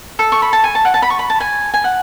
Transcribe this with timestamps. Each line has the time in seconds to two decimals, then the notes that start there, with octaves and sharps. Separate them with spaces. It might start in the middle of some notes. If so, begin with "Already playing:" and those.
0.19 A4
0.32 C#6
0.42 B5
0.53 A5
0.64 G#5
0.75 A5
0.85 F#5
0.94 A5
1.02 B5
1.10 C#6
1.19 B5
1.30 A5
1.40 G#5
1.74 G#5
1.84 F#5